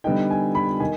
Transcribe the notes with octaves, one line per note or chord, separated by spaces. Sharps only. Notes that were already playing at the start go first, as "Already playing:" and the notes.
D3 G3 B3 D#4 G5
G#5
B5
D#3 G#5